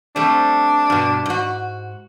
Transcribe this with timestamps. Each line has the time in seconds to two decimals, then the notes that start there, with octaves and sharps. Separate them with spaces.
0.16 G3 A3 C4 D4
0.90 G2 B2
1.26 G#2 F#4